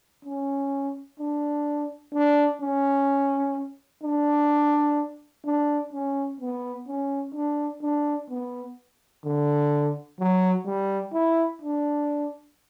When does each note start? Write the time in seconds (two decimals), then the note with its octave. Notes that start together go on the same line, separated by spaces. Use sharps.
0.25 C#4
1.19 D4
2.14 D4
2.61 C#4
4.03 D4
5.45 D4
5.93 C#4
6.40 B3
6.88 C#4
7.34 D4
7.82 D4
8.29 B3
9.25 D3
10.19 F#3
10.66 G3
11.13 E4
11.61 D4